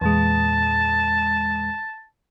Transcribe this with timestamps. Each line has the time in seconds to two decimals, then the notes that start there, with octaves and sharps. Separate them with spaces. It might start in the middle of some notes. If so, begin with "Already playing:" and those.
0.01 E2 A#2 G#3 A5